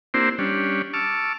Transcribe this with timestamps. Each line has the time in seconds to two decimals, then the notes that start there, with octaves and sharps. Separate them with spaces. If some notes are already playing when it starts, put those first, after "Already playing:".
0.14 A#3 C4 D4 E4 G4 C5
0.38 G3 C#4 D4
0.94 A5 C#6 D6 E6 F6